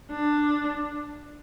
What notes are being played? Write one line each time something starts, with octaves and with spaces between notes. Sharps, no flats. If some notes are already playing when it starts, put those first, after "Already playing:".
D4